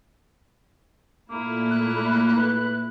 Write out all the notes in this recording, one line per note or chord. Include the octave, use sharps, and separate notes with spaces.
A#2 A3 A#3 E4
F#6
B4